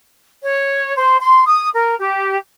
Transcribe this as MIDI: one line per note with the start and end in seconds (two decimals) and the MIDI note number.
0.43 0.95 73
0.96 1.17 72
1.19 1.42 84
1.46 1.68 87
1.74 1.95 70
1.99 2.36 67